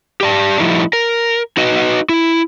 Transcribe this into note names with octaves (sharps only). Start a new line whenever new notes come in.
G4 D5 A5
F3 G3 A3 D#4 E4
A#4
D#4 F#4 B4 D#5
E4